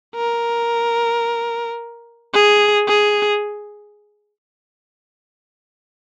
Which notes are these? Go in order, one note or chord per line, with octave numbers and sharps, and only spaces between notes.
A#4
G#4
G#4